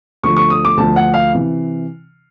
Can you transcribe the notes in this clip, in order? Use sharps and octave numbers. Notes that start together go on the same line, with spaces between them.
D2 D3 F3 C#6
C#6
D#6
D6
D2 D3 F3 A5
F#5
F5
C3 E3